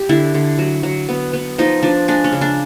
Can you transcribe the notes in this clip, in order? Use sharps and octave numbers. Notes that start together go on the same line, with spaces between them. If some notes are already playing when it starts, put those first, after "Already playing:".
Already playing: G4
D3 E4
D3
F#3
F#3
B3
B3
F3 D#4
F3 D4
G#3 D4
C#4
C#3
D4